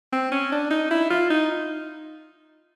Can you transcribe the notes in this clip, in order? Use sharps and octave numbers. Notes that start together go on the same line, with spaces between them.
C4
C#4
D4
D#4
E4
F4
D#4